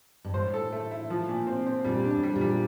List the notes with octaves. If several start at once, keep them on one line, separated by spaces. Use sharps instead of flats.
G2
A2 C5
A4
A3
E4
F3
A#2
C4
C4
A#2 G3
D4
A2
G3
A#2
G3